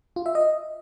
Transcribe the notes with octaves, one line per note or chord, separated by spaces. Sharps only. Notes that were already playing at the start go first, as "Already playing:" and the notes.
F4
E5
D#5